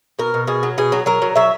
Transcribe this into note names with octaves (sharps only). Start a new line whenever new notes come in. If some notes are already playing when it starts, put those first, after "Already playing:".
B2 A#4
B2
B2 G#4
F#3
B2 G#4
F#3
F#3 A#4
F#3
F#3 E5